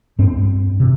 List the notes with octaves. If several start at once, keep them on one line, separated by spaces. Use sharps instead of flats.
G2 C4
C3